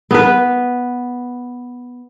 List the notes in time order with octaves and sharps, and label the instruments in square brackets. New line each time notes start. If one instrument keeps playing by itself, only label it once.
[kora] B3 B4